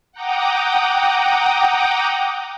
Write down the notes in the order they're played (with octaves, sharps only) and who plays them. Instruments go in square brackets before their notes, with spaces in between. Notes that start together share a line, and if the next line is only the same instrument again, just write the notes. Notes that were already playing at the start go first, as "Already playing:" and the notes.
[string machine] F#5 G5 A#5 D6 D#6